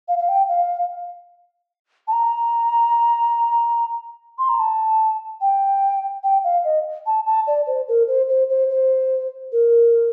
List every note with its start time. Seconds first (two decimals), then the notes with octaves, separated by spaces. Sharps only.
0.08 F5
0.19 F5
0.29 G5
0.49 F5
2.08 A5
2.13 A#5
4.38 C6
4.49 A#5
4.59 A5
5.41 G5
6.24 G5
6.44 F5
6.65 D#5
7.06 A5
7.26 A5
7.47 D5
7.67 C5
7.88 A#4
8.08 C5
8.29 C5
8.50 C5
8.70 C5
9.52 A#4